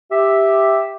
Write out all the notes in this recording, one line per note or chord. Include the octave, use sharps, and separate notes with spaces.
G4 E5